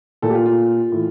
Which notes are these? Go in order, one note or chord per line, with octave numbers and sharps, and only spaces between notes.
A#2 A4
G4
F4
F4
A2 E3